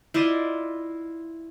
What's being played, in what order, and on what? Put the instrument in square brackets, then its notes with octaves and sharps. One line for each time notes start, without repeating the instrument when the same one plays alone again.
[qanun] E4 F4 D5 D#5